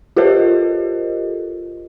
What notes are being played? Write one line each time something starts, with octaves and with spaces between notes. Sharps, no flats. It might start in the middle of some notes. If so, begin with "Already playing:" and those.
F4 G4 A4 A#4 C5 D#5